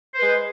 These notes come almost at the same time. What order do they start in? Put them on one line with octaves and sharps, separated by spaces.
C5 B4 G#3